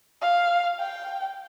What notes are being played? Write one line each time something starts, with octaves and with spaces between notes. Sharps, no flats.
F5
G5